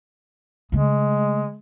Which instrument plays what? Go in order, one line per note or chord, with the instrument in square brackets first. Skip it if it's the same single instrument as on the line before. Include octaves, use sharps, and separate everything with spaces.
[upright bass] C#3 A3 [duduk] G#3